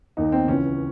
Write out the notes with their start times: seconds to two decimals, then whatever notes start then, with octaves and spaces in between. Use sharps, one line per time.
0.17 D#2 D#3 D#4
0.32 C4
0.48 C#2 C#3 E3 C#4